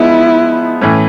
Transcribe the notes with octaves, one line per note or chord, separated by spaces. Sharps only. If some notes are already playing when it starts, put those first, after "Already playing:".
Already playing: F3 G#3 B3 D#4 E4
A2 E3 A3 C#4